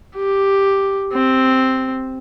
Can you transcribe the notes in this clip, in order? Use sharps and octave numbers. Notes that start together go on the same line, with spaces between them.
G4
C4